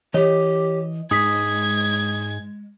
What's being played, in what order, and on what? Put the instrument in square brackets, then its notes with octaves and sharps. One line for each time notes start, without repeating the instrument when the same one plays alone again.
[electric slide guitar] E3 D#5 [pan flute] G4 [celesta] C#5
[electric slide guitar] G#2 D#4 G#4 [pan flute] G#3 [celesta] D#6 B6 [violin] G#6